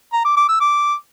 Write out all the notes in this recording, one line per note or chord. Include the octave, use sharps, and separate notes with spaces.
A#5
D6
D6
E6
D6